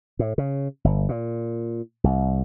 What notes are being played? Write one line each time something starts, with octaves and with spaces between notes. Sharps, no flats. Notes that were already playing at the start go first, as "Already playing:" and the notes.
A2
C#3
G1
A#2
C2